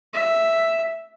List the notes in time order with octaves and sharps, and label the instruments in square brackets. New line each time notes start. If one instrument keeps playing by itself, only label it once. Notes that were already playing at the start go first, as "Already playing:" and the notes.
[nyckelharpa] E5